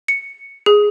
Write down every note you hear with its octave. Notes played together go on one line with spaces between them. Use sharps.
C#7
G#4